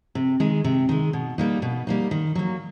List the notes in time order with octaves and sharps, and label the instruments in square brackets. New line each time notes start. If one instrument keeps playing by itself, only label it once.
[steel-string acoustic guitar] C3
D#3 G#3
C3
D#3 G#3
B2
G3 A#3 D#4
B2
G3 A#3 D#4
D#3
F#3 A#3